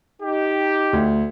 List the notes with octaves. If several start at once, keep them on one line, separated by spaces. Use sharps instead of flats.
D#4 G4
D2